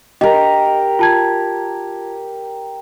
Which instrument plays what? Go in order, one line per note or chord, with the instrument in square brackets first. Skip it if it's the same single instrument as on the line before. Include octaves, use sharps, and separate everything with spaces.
[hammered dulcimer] G4 A#4 [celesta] D#5
[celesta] F4 A5 G#6